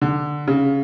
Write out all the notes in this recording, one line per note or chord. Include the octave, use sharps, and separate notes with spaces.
D3
C#3